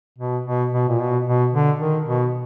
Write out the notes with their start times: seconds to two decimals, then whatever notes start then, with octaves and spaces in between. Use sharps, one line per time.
0.18 B2
0.46 B2
0.72 B2
0.88 A#2
0.99 B2
1.26 B2
1.53 D3
1.79 D#3
2.06 B2